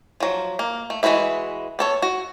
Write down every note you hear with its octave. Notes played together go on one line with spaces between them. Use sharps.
F3 F#3
A#3
A3
E3 G#3 F#4 B4 E5
B3 A4 C#5
F#4